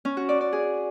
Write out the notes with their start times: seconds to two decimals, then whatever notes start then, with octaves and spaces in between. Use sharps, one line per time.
0.05 C#4
0.17 F#4
0.29 D5
0.41 D5
0.53 G#4